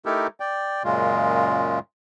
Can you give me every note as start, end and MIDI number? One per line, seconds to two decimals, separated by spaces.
0.06 0.27 57
0.06 0.27 63
0.06 0.27 64
0.06 0.27 67
0.06 0.27 69
0.06 0.27 70
0.40 0.83 74
0.40 0.83 79
0.84 1.79 42
0.84 1.79 46
0.84 1.79 49
0.84 1.79 56
0.84 1.79 65